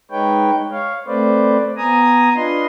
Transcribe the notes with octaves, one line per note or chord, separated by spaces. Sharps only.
G#3 D#4 B4 C#5 G5
C#5 F5
A3 C4 B4 C5 D5
B3 G#5 A#5 D#6
D4 F4 B4 D#5 C6